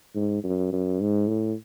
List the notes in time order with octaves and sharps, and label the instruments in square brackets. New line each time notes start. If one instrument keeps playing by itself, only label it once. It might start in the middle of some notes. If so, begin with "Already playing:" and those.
[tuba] G#2
F#2
F#2
G#2
A2